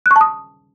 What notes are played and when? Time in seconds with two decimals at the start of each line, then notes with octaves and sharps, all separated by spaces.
0.06 F#6
0.11 C#6
0.16 A5
0.21 D#6